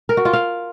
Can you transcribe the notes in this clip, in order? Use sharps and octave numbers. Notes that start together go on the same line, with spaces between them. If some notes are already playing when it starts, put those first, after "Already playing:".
A#4
F#4
F4
F5